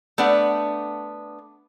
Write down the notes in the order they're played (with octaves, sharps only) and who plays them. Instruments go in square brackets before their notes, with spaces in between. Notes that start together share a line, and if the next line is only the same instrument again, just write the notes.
[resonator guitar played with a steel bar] A3 B3 D4 F#5